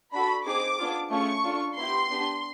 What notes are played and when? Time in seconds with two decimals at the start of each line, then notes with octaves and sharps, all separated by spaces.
0.13 D4 F#4 A4 B5
0.46 C4 D#4 G#4 D6
0.78 B3 D4 F4 G#4
1.11 A3 C#4 F4 G#4 C#6
1.44 D4 F4 A4
1.76 B3 E4 G4 C6
2.10 B3 D4 G4